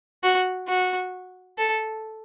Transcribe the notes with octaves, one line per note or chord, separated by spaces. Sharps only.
F#4
F#4
A4